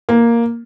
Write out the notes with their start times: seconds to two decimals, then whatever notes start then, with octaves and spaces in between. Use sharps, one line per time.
0.09 A#3